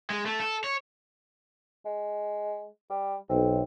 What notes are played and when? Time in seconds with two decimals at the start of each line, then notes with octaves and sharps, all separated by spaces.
0.10 G#3
0.26 A3
0.40 A4
0.64 C#5
1.85 G#3
2.90 G3
3.29 B1 C4